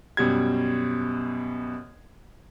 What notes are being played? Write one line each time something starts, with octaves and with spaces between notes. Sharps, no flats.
F#2 B2 G3 G#6